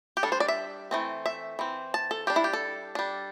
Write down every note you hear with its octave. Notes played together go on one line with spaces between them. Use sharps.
G4
G3 D4 A4
C5
D5
E5
E3 A3 C4
E5
E3 C4
A5
A4
G3 D4 G4
E4
G4
A4
G3 D4